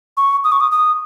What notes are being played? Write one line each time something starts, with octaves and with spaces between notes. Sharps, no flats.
C#6
D#6
C#6
D#6
D#6